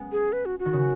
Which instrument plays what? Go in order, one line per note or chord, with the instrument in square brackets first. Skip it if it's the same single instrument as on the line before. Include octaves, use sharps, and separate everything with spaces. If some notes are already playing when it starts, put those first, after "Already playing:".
Already playing: [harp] G#3 B3 C#4
[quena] G#4
B4
F#4
F#4
[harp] D#3
C#3